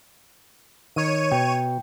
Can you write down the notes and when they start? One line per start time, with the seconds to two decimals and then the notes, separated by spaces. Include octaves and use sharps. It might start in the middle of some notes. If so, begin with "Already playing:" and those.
0.96 D#3 C#5 D#7
1.32 B2 G5